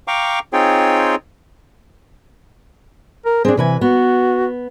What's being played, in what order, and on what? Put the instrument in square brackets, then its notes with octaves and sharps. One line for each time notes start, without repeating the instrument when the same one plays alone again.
[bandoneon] F5 G5 A#5 C#6 D6
C4 D#4 F4 G#4 C#5 G5
[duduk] A#4
[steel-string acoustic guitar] C4 D4 [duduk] G#4
[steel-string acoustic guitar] C3 B4 G#5 [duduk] E3
[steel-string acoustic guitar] B3 [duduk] F#4